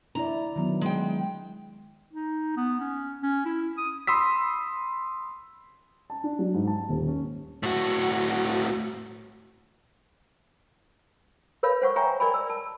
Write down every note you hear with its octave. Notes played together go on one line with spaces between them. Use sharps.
D4 E4 D5 A#5
D#3 F#3 B3
G#3 G5
D#4
B3
C#4
C#4
E4
D#6
B5 C6 D#6 E6 B6
A5
D4
F#3
G#2
A5
D#1
C#4
A2 F#4
A#4 B4 C#5 F5 B5
C5 F#5 C#6
C#5 E5 G5 G#5 A#5 C#6
A#4 D5 D#5 G#5 B5
D5 E6
A5